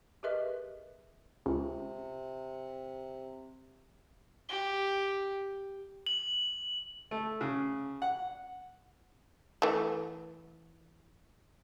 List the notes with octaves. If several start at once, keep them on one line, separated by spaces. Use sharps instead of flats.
G4 G#4 A#4 B4 D#5 E5
C#2 C3
G4
F#7
A3
C#3
F#5
E3 A3